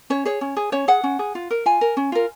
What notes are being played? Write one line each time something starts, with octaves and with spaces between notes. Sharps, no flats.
C#4 C#5
G#4 C#5
C#4
G#4
C#4 C#5
G#4 F#5
C#4
G#4
F4
A#4
F4 G#5
A#4
C#4
F4 A#4